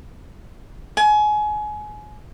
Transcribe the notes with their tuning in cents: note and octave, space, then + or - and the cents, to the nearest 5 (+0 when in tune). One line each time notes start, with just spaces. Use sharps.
G#5 +25